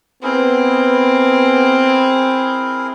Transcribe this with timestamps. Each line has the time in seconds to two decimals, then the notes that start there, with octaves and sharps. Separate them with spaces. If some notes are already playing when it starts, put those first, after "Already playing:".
0.23 B3 C4 E4 G#4 A#4